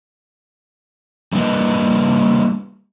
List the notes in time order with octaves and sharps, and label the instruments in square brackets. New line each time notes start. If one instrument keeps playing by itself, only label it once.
[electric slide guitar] G3 A#3 D4 F4 B4 D#5